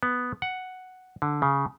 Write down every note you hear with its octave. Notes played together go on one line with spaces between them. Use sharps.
B3
F#5
D3
C#3